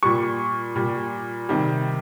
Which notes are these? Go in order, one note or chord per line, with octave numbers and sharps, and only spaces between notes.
A#2 G3 C#6
A#2 G3
C3 D#3 G3